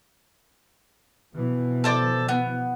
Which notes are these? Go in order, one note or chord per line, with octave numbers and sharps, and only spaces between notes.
B2 E3 F3
A4 C5 D5
B3